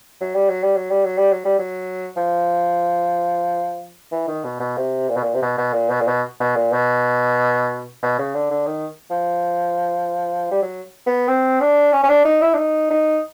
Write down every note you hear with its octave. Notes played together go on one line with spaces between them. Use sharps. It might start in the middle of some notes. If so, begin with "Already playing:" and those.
F#3
G3
F#3
G3
F#3
G3
F#3
G3
F#3
G3
F#3
F3
E3
D#3
B2
B2
C3
A#2
B2
A#2
C3
B2
B2
A#2
B2
A#2
B2
B2
A#2
B2
B2
C#3
D3
D3
D#3
F3
G3
F#3
B3
C4
D4
C#4
C#4
D4
D#4
E4
D4
D#4
D#4